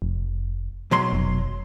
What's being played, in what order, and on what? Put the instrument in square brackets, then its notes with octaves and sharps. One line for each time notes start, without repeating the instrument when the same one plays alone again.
[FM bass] F1
[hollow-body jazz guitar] B1 F#3 C6
[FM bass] F1